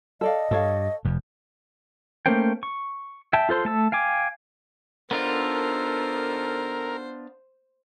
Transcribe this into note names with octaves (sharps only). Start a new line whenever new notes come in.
A4 D5 D#5 F5
G2 A4 C#5 F5
F1 F2
A3 A#3 C#4 C5 G5
C#6
E5 G5 A5
F4 A4 C5 C6
A3 A5 E6
F5 G5 G#5 D6
D#2 D#3 B3 D4 F4 A4 A#4 C5